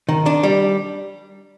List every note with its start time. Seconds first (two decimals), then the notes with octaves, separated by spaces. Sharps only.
0.09 D#3
0.26 D4
0.43 G3